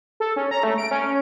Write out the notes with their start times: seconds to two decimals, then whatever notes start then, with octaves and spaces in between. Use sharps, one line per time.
0.20 A4
0.36 C#4
0.51 A#5
0.63 A3
0.78 D7
0.91 C#4